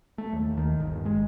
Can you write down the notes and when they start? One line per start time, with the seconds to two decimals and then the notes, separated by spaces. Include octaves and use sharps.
0.18 A3
0.33 D#2
0.58 D#3
0.80 G1
1.05 G#3